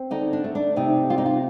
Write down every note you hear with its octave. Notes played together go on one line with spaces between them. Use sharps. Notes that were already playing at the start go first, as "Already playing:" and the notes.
Already playing: C4
D3 D#4
D4
A3
D4
C3 D#4
A#3 F4
D#4
F4